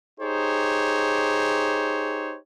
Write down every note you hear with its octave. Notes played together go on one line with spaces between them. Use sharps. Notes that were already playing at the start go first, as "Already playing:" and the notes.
D#4 G4 G#4 C5 C#5